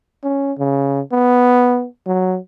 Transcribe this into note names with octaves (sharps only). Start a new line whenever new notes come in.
C#4
C#3
B3
F#3